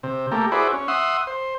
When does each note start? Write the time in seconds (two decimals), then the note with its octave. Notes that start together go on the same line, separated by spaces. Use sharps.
0.03 C3
0.32 A3 A#3 G4
0.52 E4 F#4 G#4 B4 C5 D5
0.73 C#4
0.88 E5 F#5 C6 D#6
1.27 C5